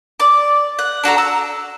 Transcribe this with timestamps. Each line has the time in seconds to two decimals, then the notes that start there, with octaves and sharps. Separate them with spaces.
0.20 D5 D6
0.79 F#5
1.04 D4 F#4 A4 A#5
1.18 E6